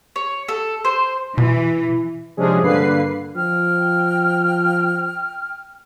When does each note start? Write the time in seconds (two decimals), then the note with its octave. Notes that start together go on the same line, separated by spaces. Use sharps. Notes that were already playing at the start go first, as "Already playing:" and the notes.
0.16 C#5
0.48 A4
0.85 C5
1.38 B2 E3
2.37 C3 F3 G#3 C#4 D4 G#4
2.62 G2 D3 A#3 B4 C7
3.35 F3 G5 F6